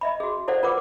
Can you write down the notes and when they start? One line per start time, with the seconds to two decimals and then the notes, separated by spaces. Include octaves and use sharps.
0.01 D#5 E5 B5
0.20 F#4 G#4
0.48 E4 A4 C5 D5 F5 F#5
0.63 F4 A#4 B4 F#5 D6